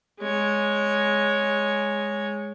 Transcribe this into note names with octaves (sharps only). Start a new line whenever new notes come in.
G#3 C#5